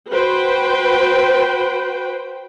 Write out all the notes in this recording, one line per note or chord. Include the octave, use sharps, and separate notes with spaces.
F#4 B4 C5 G5